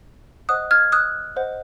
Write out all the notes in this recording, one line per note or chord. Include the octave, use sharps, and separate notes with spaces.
C5 D#5 F#5 D#6 F#6
F6 G#6
D#6 F#6
C5 D#5 F#5